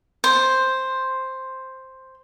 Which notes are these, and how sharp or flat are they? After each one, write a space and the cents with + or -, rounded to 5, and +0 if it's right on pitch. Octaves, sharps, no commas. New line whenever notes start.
C5 +5